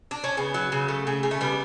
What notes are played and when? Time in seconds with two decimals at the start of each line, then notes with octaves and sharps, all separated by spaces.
0.11 D4
0.24 C#4
0.37 C#3 B3
0.54 F#3
0.72 C#3
0.88 A3
1.07 C#3
1.23 C#3
1.31 A3
1.41 G3 B3